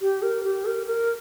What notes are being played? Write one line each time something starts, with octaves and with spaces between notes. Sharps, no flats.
G4
A#4
G4
A#4
A#4